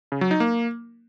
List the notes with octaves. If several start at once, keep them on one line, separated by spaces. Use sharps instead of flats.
C#3
F#3
D#4
A#3